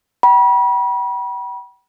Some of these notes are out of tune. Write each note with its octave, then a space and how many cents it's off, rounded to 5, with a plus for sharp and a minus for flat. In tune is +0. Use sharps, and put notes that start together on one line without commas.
G5 -35 B5 -35